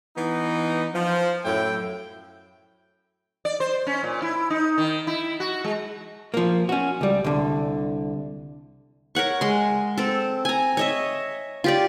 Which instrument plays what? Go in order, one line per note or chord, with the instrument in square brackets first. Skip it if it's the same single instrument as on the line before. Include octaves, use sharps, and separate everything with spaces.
[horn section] E3 B3 D#4
F3
F#2 A2 E4 G5
[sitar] D5
C5
C#4
A#2
E4
D#4
D#3
E4
F#4
G#3
[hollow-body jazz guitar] F3 A#3
C#4 F#4
C#2 G3
C2 D3
[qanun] A#4 C#5 F#5 C#6
G#3 C6
C4 A4
G#5 A#5
C#5 D#5 E5
F4 G4 D5